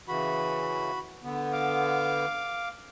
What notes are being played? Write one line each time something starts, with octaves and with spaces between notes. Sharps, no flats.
C#3 E3 F#4 B5
D3 B3
F5 D6